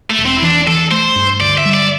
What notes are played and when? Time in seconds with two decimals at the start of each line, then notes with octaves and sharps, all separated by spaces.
0.10 A3
0.19 E1
0.26 C4
0.37 E4
0.42 E3 D4
0.67 E3 A4
0.91 A3 C5
1.16 G2
1.41 D2 D5
1.58 E5
1.65 G3
1.74 D5